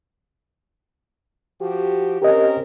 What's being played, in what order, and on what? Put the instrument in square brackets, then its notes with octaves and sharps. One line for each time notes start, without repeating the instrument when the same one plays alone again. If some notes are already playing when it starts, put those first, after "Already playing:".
[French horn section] F3 F#4 G4
[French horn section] C4 C#4 A#4 [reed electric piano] G4 D#5